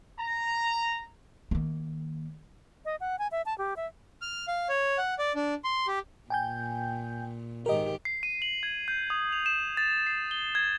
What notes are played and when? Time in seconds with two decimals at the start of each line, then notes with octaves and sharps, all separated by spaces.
0.19 A#5
1.51 D#3 A#3
2.85 D#5
3.00 F#5
3.19 G#5
3.32 E5
3.46 A5
3.58 G4
3.77 E5
4.22 F6
4.48 F5
4.69 C#5
4.98 F#5
5.19 D5
5.35 D4
5.64 C6
5.87 G4
6.30 A#2 G5 G#5 G6
7.66 G#2 D#3 G4 A#4 D#5
8.05 C7
8.23 D#7
8.42 F#7
8.63 G#6
8.88 G6
9.10 D#6
9.32 F7
9.46 E7
9.77 A6
10.07 C7
10.31 G7
10.55 G#6